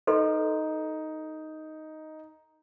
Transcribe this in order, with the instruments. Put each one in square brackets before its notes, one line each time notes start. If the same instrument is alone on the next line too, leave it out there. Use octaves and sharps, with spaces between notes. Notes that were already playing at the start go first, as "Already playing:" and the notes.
[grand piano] D#4 [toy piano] A4 B4 C6